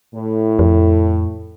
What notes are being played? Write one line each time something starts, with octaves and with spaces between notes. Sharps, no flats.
A2
F2